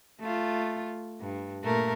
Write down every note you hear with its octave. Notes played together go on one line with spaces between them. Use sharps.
A3 F4
G2
A#2 A3 A#4